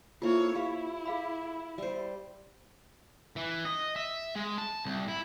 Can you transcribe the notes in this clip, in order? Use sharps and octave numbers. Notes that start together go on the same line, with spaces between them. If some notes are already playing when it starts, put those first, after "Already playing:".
A#3 E4 F4 A4 C5 C#5 E5
E4 G4 E5 F5
G#4 F5 B5
G3 C5
E3
D#5
E5
G#3
A5
C2
E4